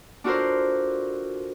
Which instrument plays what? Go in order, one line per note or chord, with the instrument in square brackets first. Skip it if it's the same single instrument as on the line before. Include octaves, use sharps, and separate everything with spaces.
[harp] D4 F4 F#4 A4 A#4 C5